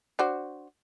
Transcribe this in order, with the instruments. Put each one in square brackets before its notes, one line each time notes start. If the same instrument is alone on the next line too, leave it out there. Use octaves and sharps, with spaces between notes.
[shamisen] D4 F#4 C5